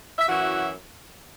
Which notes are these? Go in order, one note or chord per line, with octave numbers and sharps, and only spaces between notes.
E5
F#2 E3 C#4 E4 F#4 F#5